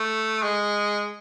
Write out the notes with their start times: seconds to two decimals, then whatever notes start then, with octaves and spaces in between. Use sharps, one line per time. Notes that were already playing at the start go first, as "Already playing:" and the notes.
Already playing: A3
0.43 G#3